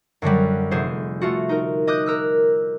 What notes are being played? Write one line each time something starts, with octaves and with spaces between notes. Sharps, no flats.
F#2 D3 F#3 G3
F1 G#4 C5
A3 F4 F#4
D#4 A#4
D#5 D6 D#6 F#6 G6
A#4 E6 F#6